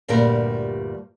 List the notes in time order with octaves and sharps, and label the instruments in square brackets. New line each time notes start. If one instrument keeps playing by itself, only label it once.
[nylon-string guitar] D2 G2 A#2 G3 A#4